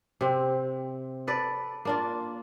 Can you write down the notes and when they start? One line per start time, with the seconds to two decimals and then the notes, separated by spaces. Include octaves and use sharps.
0.21 C3 C4
1.27 A4 B4 D5
1.85 A#3 D4 F4